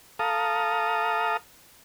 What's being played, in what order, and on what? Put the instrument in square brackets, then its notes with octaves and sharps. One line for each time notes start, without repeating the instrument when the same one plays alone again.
[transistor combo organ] A4 F5 A#5 D#6